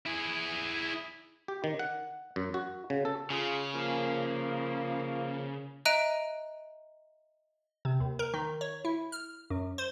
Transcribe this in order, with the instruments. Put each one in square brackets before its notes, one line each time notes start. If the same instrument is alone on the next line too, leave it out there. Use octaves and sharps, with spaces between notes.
[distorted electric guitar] E4 G#4
[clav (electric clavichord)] G4
D#3
F#5
F#2
F#4
C#3
A4
[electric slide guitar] C#3 [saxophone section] F4 G#4
[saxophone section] F3 A#3
[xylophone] D#5 E5 A#5 F#6 D7 D#7
[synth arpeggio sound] C3
D#2
A#4
D#3
C#5
E4
F6
F#2
C5